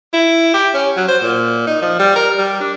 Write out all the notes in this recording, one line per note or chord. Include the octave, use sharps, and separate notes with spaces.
E4
G4
C#4
F#3
C5
A#2
D#4
F3
G3
A#4
G3
D4